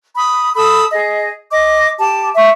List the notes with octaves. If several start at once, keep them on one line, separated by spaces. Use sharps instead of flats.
B5 D#6
A4 B5 D#6 E6
G#4 D#5
D#5 D6
G4 A5
E5 C#6